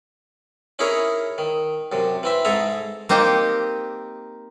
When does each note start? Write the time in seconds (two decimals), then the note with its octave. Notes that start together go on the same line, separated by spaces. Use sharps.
0.79 C#4 D#4 E4 G#4 A#4 C#5
1.38 D#3
1.92 F#2 C3
2.23 E3 C4 E5
2.45 G#2 G#4 A4 E5 A#5
3.09 A#3 C4 D#4 G4 C5